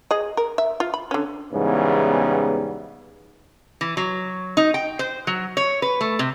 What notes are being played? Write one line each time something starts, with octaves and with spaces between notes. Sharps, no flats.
G#4 D#5
A#4
E5
F4
B5
D3 C#4
E2 G#2 C#3 E3 G3 B3
E3
F#3
D#4
G5
C5
F#3
C#5
B4
A3
C3